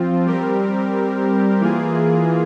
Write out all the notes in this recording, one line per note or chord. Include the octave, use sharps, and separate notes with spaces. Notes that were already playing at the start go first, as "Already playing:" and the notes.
Already playing: F3 C4 F4
G3 C4 G4 A#4
E3 A#3 F4 G#4